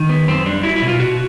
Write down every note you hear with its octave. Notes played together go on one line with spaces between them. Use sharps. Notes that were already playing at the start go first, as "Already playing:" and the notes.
Already playing: D#3
B3
F#2 C4
G3 D4
F#3 E4
E4
B2
F4
B2 F#4